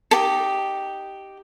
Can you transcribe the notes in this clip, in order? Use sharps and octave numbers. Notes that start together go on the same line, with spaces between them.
D#4 G4 A4